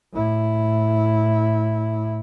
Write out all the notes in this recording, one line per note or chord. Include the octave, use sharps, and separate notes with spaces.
A2 E4